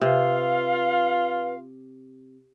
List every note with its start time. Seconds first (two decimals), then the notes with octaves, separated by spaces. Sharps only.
0.01 C3 F4 B4 F5